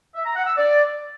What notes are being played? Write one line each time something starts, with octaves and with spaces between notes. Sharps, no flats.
E5
A#5
F#5
E6
D5